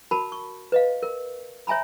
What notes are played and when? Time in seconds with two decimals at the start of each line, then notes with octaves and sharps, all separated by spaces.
0.11 F#4 A#4 A5 B5
0.32 C#6
0.72 B4 D#5 F5
1.03 A#4
1.67 C#5 E5 G#5 A#5 B5